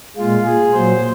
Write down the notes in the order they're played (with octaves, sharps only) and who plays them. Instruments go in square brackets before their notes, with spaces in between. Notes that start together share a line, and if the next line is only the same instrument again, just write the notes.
[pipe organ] A#2 G#3 F4
G#4
A#2 F#3 C5